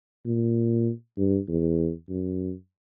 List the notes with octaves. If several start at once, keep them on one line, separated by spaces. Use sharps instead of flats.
A#2
G2
E2
F#2